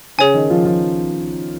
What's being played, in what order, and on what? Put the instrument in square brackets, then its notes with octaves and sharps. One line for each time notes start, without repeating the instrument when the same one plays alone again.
[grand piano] C#3 C#4 [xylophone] G#4 C#5 G#5
[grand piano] D#3 D#4
F3 F4
F3 F4